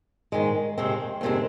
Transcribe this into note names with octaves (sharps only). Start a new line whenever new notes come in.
G#2 D#3 G#3
F2 C3 D#3 G#3 C4
F2 C3 D#3 G#3 C4